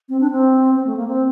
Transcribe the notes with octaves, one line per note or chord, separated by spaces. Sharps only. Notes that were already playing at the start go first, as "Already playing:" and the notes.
C4
D4
C4
C4
A3
A#3
C4